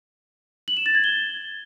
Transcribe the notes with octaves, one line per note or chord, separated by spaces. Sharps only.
F#7
E7
A6
G#6
G7